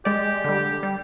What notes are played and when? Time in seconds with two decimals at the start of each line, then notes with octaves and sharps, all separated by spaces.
0.05 G#3 G4 D5
0.44 D3 G3
0.83 G3